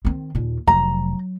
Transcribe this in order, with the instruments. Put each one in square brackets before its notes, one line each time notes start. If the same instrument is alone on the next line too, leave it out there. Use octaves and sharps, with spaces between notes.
[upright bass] D#3 C4
D#2 A#2
[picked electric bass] F1 [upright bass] F#3 [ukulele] A#5